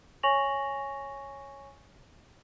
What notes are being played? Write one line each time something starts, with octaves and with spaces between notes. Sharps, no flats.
C#5 G#5 C#6 A#6 F7 F#7